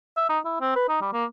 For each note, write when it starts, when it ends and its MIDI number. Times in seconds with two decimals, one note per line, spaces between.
0.17 0.29 76
0.29 0.39 63
0.45 0.57 64
0.61 0.71 60
0.76 0.86 71
0.89 0.98 63
1.01 1.09 55
1.13 1.25 58